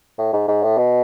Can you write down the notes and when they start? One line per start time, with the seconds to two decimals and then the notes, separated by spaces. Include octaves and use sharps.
0.18 A2
0.33 G#2
0.48 G#2
0.63 A2
0.77 B2